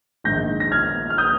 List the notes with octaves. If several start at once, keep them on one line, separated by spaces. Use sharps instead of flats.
A#1 G#2 D#3 G6 A#6
A#6
F6 G#6
F6
D#6 G6